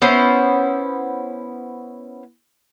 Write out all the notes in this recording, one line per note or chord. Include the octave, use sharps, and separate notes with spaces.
B3 C#4 E4 C5